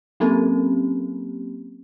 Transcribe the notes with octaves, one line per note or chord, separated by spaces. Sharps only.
F#3 A#3 C4 C#4 G4